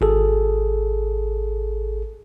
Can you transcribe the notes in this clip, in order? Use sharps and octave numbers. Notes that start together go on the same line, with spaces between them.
G#1 G#4 A4